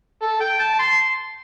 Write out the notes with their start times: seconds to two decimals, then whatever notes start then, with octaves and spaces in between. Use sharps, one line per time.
0.22 A4
0.41 G5
0.60 A5
0.73 A5
0.79 C6